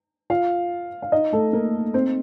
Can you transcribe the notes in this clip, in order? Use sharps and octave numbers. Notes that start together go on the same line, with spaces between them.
F4 F5
F5
D#4 D#5
A3 A4
A#3 A#4
C4 C5